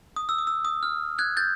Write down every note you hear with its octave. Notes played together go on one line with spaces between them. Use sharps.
D#6
E6
D#6
E6
D#6
F6
F#6 G#6
G6 A6